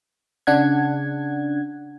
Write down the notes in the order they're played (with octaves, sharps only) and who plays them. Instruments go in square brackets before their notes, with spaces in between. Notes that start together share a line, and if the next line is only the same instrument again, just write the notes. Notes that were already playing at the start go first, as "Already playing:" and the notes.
[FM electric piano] C#3 D4 F#5 G#6